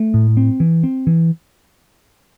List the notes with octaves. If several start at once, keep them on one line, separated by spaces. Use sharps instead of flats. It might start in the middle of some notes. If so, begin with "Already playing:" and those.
Already playing: A3
A2
C4
E3
C4
E3